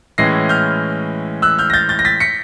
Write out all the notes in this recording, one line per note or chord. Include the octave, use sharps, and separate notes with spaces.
A2 E3 G#3 C#4 A#6 C7
F6 G6
E6 F#6
F6 G6
A#6
G6 A6
G6 A6
A#6
A6 B6
B6 C#7